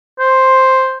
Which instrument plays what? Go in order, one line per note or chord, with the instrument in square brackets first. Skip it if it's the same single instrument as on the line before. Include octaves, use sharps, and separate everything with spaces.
[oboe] C5